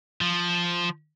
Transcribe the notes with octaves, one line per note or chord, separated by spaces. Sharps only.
F3